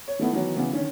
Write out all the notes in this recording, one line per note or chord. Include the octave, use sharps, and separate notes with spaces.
C#5
D#3 A3 B3 E4
D#3 E3 F#3 B3
C#3 E3 B3
D3 D#3 C#4